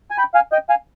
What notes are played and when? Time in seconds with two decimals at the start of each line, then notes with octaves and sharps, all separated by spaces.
0.11 G#5
0.18 G5 B5
0.34 F5 G#5
0.52 D#5 G5
0.69 F5 G#5